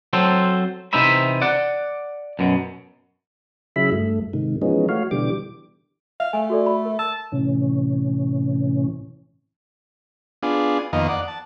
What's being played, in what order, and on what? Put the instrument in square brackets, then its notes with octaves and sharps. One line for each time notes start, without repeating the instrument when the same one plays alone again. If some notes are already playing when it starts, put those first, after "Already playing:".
[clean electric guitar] F#3 C4 A4 C5
C3 E3 D#4 C5 E5 B5
D5 F#5
F#2 B2
[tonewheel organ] C#3 F#3 E4 G#4 E5 B5
G2 A3
G#2 C3 D#3
E3 F3 G#3 B3 C#4 D#4
A3 F#4 C#5 F5
B2 D3 E3 G3 G4 D6
[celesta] E5 [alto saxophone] F5
[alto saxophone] A3 [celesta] G#5
[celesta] F#4 A4 D5
B5
A#4
[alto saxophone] A5 [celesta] E6
[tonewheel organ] A2 C3 E3 C#4
[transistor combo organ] B3 D4 F4 G#4
F2 D#3 A#3 B3 D#5 F5
D5 F#5
A5